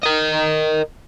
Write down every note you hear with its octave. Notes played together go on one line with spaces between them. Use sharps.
A#4 D#5